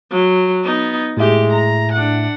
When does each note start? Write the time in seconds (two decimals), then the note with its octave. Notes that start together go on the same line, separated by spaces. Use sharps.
0.11 F#3
0.64 B3 D#4
1.17 A2 G#3 G4 E5
1.53 A#5
1.92 D4 F#5